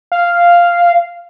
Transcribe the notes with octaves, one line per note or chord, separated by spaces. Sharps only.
F5